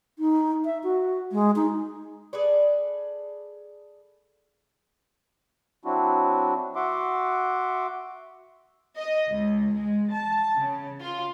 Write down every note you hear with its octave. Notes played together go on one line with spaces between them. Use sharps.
D#4
E5
F#4
G#3
D#4
G#4 A4 B4 D5
F#3 C4 D4 E4 F#4
F#4 E5 F#5 C6 D6
D#5
C#2
G#3
A5
C#3
F4